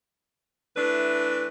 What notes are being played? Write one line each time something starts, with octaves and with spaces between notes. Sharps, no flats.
E3 A3 D4 B4